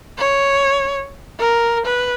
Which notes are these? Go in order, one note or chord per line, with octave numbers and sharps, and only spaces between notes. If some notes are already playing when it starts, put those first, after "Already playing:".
C#5
A#4
B4